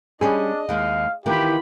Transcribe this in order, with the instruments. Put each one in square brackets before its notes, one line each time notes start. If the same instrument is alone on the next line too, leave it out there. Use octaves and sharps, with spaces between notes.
[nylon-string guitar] G3 C#4 [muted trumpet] D4 [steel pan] G#4 [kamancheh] D#5
[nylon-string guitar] D#2 G#3 [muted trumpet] F5
[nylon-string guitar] D#3 E3 B3 [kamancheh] F4 B5 [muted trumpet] G4